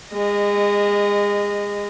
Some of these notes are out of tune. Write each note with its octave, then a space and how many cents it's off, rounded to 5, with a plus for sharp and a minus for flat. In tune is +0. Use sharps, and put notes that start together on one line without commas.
G#3 -30 D#5 -15